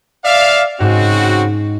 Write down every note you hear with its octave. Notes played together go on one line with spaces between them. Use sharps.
D5 E5 F5
G#2 C#3 C4 F#4